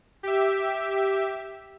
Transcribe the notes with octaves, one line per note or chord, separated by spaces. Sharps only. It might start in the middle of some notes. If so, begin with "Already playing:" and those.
G4 E5